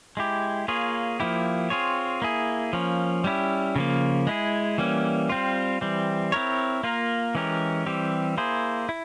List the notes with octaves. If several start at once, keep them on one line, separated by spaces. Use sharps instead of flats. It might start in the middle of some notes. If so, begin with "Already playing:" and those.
G#3 E4 G4
A#3 F4 G#4 C#5
F3 A#3 E4 G4
C4 F4 G#4 C#5
A#3 E4 G#4
F3 A#3 C#4
G3 C#4 E4 G4
C#3 F3 A#3
G#3 E4 G#4
E3 G3 A#3 C#4
G3 C4 F4
E3 G3 C4
C4 E4 A#4 C#5
A#3 F4 A#4
E3 G#3 C#4 G4 A#4
E3 G3 C4 G4
A#3 E4 G#4 C5
E4